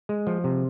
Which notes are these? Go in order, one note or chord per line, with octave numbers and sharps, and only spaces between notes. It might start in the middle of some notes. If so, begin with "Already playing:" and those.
G#3
F3
C3